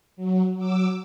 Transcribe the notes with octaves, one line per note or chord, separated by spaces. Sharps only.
F#3
F#3 D6 E6